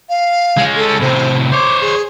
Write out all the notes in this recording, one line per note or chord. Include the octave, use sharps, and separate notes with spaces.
F5
G#3 C#4
A4
A2 C3 C5
C5 C#5 D6
G#4